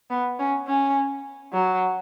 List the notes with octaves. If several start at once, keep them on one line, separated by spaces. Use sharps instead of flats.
B3
C#4
C#4
F#3